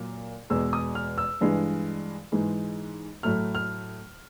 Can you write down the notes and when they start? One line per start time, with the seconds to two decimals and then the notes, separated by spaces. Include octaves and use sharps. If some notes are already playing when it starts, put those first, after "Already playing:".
Already playing: A#2 F#3 A#3
0.50 E2 B2 G#3 E6
0.73 D#6
0.95 F6
1.18 E6
1.41 G2 E3 G#3
2.32 G#2 E3 G#3
3.23 A2 F#3 A3 F6
3.55 F6